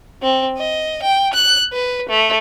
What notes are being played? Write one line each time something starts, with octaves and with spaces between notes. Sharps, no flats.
C4
D#5
G5
F#6
B4
A3